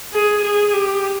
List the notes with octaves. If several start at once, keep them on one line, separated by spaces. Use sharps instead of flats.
G#4
G#4
G4